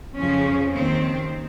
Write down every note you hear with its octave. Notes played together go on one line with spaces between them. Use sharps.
F2 C#3 F3 C#4
D#2 D#3 C4